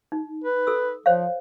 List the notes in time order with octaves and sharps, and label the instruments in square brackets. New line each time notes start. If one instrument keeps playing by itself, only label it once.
[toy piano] D#4
[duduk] B4
[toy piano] A4 E6
[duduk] F3 [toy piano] C5 C#5 F5